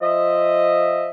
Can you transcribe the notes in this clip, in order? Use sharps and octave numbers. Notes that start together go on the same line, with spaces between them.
F3 D#5 E5